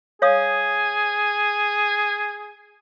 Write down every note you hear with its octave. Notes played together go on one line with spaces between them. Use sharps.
G#4 C#5 F5 D#6